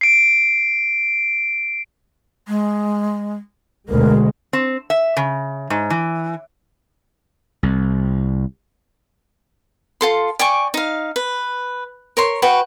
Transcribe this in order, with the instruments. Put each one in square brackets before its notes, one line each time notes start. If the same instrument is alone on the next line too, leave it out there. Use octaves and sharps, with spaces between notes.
[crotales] C7 D7
[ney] G#3
[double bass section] D2 B2 G#3 [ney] A#4
[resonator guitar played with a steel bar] C4
E5
C#3
G#2
E3
[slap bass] C2
[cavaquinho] F4 A4 C6
D5 G5 G#5 C#6
D#4 F5
B4
A#4 C#5 C6
F#4 B4 G5 C#6